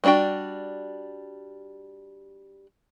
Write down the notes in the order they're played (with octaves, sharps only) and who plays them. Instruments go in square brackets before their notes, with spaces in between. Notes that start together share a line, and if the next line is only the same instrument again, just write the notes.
[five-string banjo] G3 A#3 D4 F#4 G5